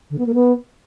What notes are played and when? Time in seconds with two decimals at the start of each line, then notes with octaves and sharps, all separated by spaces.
0.10 D3
0.18 B3
0.26 A#3
0.34 B3